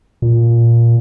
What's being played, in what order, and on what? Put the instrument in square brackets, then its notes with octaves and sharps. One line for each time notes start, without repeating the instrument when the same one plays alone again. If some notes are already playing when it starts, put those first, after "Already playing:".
[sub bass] A#2